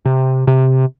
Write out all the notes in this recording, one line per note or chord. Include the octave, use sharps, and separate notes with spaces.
C3
C3